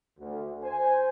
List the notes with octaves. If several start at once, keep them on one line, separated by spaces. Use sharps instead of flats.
D2
C5 G#5